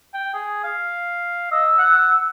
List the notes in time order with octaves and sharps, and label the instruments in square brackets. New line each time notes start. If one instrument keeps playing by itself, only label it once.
[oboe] G5
G#4
F5
[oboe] D#5 [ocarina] E6
[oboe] F#5